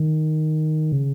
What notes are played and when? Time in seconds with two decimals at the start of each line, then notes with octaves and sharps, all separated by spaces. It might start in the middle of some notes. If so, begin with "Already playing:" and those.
Already playing: D#3
0.92 C#3